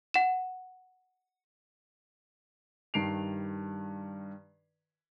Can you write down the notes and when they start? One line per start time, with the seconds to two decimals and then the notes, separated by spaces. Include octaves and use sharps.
0.14 F#5 E7
2.94 G2 D#3 C7 D7 F7